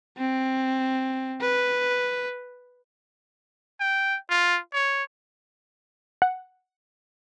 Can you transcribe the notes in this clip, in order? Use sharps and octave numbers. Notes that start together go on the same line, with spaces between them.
C4
B4
G5
F4
C#5
F#5